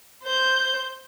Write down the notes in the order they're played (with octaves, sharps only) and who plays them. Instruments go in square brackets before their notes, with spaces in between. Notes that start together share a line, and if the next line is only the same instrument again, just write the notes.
[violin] C5 G6